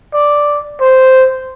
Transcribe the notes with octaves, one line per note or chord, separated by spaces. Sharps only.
D5
C5